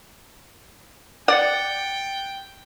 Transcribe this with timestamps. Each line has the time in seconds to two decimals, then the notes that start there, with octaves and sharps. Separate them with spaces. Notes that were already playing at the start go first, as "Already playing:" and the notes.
1.28 D5 F#5 G5 F#6 A6 C#7